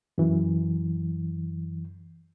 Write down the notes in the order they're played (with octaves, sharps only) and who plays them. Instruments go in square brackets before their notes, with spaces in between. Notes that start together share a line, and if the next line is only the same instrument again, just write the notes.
[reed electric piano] F#2 E3